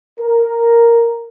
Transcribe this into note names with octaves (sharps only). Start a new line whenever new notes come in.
A#4